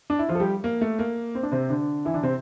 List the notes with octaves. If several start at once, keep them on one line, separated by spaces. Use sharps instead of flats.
D4
E4
F3 F4
A4
G3 G4
A#3
A3
A#3
C4
D4
C3 C4
D3 D4
E3 E4
D3 D4
C3 C4